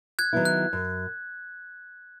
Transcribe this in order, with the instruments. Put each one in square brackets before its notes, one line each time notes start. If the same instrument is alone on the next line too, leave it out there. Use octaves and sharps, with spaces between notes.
[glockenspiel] F#6 G#6
[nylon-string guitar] D#3 F#3 B3 E4
[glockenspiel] F#6
[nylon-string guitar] F#2